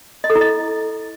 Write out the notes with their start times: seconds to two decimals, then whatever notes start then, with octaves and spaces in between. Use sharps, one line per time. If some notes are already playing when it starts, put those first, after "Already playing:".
0.24 D#5
0.30 A4
0.35 E4
0.41 D#5